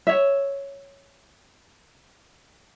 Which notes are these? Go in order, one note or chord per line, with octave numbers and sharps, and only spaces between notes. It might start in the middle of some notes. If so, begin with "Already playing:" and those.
C#5 E5